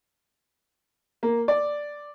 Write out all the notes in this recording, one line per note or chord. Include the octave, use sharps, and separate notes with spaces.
A#3
D5